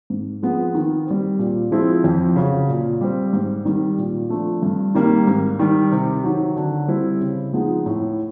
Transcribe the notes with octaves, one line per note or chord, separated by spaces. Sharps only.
G#2
F3 G#3 B3
D#3
G3 C4
A#2
F3 G#3 C4 E4
F2
C#3 F#3
A#2
G3 C4
G#2
D#3 G3
A#2
F3 A3 D4
G2
D#3 G3 A#3
G#2
D#3 G3
C3
D#3 F#3
D3
G3 C4 E4
C#3
F3 G#3 B3 D#4
A2